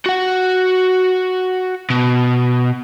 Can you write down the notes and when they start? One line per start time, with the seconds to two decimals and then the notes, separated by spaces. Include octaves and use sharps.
0.06 F#4 F#5
1.90 B2